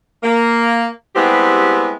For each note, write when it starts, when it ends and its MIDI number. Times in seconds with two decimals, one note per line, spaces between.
0.23 0.86 58
1.16 1.92 55
1.16 1.92 56
1.16 1.92 59
1.16 1.92 60
1.16 1.92 64
1.16 1.92 67